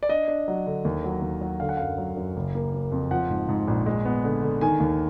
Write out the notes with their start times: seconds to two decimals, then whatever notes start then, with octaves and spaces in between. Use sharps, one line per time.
0.03 D5
0.09 D4 D#5
0.28 D4
0.48 F#3
0.66 D3
0.85 D#2
1.04 F#3
1.22 D#2
1.41 F#3
1.60 D3 F5
1.69 F#5
1.77 F#2 F5
1.98 F#3
2.17 F#2
2.36 F#1
2.55 A#3
2.74 A#3
2.92 F2
3.11 F3 F#5
3.30 G#2
3.49 G#2
3.68 A#1
3.86 G#3
4.05 B3
4.24 D3
4.43 D3
4.61 D#3 G#5
4.80 D#2